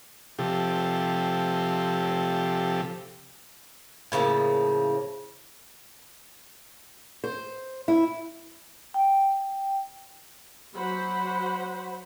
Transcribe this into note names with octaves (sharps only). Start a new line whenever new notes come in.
C3 F3 G4 A4
A2 C#3 F3 A#3
C5
E4
G5
F#3 C5 F#5 B5